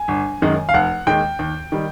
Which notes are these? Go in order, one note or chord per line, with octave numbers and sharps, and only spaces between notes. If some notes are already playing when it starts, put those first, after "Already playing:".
Already playing: G#5
G1
F#2 D#3 G#3
F5
F1 F#5
D#2 D#3 G#3 G5
D#2
D#3 G3